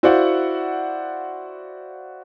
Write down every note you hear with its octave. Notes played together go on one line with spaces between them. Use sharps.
E4 F#4 C5 D5 F5 F#5